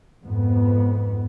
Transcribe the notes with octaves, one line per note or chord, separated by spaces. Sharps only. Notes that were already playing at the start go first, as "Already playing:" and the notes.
F2 G#2 B3